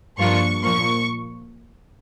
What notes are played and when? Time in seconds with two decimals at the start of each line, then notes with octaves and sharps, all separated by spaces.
0.18 G2 F3 A#3 D4 F4 C#6
0.62 A#2 F3 A#3 C#6